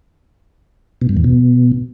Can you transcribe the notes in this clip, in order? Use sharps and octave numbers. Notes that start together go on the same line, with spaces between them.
B2
G2
E2
B2